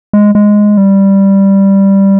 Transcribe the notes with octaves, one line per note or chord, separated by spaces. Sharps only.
G#3
G#3
G3